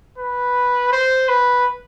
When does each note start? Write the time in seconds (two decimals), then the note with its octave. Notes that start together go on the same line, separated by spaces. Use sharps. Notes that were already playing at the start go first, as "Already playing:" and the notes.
0.18 B4
0.92 C5
1.29 B4